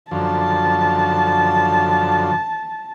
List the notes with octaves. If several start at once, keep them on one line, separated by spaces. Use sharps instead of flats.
F#2 D3 F3 A5